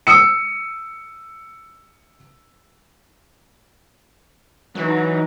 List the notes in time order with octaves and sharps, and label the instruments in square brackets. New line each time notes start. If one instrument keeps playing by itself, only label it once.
[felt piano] D#6 E6 C#7
[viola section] E3 D#4 [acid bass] F#3